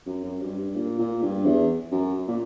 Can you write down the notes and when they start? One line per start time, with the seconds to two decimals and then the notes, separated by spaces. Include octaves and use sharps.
0.06 F#2
0.24 F#2
0.41 G2
0.58 G2
0.76 A#2
0.99 A#2
1.22 G2
1.45 E2
1.91 F#2
2.28 A#2